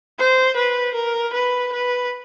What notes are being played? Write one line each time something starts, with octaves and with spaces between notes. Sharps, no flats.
C5
B4
A#4
B4
B4